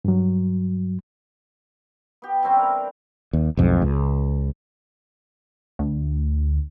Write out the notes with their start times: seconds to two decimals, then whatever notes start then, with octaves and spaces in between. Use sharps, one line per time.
0.05 G2 F#3
2.22 B3 G4
2.43 E3 G3 C4 C#4
2.57 D4 A#4
3.33 D#2
3.57 B1 F2 G#2
3.82 C#2
5.79 D2